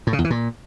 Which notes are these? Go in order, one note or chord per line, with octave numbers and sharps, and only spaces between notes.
A2
C#3
E2
E3
A#2